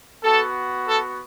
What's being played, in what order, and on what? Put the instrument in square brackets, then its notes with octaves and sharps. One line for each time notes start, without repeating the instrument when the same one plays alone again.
[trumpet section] B3 F#4 A4
A4